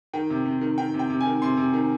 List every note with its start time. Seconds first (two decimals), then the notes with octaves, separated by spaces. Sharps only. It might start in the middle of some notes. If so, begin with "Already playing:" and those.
0.13 D#3 G5
0.30 C3
0.45 C3
0.61 D#3
0.78 D#3 G5
0.94 C3
0.99 G5
1.10 C3
1.21 D#3 G#5
1.42 C3 C6
1.57 C3
1.74 D#3